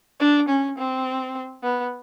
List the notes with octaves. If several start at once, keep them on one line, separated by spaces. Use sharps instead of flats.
D4
C#4
C4
B3